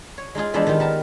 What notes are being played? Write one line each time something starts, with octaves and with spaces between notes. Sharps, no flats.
C#5
G#3 D#4 F4 G#4
E3 F3 G#3 B3 D4 E5
D#3 G3 F4 G4
B3 A#4 A5